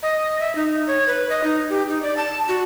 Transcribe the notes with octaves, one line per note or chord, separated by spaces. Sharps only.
D#5
E5
D#4
C#5
B4
D#5
D#4
G4
D#4
D5
A5
F#4